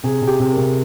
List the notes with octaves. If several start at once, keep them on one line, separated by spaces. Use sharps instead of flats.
C3 G#4
C3
G4
C3
A#4
C3